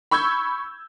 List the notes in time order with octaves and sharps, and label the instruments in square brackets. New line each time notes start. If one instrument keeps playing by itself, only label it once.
[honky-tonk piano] B5 C#6 E6 G6 G#6